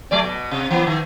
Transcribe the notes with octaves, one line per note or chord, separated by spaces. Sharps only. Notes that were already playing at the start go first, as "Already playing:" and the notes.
F#3 A3 D5
B2
C3
E3 B3
D#3